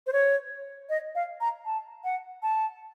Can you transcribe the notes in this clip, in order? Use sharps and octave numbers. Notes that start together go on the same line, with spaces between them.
C5
C#5
D#5
F5
A#5
A5
F#5
A5